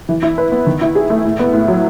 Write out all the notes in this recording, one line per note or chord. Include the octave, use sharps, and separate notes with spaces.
E3
E4
B4
B3
D#3
E4
G#4
A3
A2
B3
A2
F#3